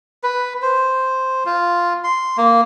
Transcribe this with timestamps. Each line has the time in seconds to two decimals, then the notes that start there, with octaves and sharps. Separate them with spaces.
0.23 B4
0.62 C5
1.46 F4
2.04 C6
2.37 A#3